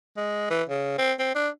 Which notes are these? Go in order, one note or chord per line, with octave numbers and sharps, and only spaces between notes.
G#3
E3
C#3
C4
C4
D4